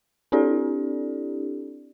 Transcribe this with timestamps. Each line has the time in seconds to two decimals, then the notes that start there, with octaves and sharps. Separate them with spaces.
0.32 C4 D4 E4 G4 A4 D5